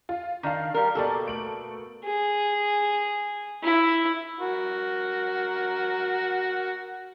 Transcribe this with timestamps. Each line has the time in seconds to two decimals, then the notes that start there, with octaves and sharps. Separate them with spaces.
0.09 F4
0.43 D#3 D4 F5
0.74 G3 A#4
0.95 B2 A#3 G4 A4 D5
1.26 A3 D7 F#7
2.05 G#4
3.63 E4
4.40 F#4 A#4